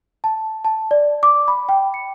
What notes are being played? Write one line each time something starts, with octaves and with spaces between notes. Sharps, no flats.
A5
A5
D5
D6
B5
G5
C#7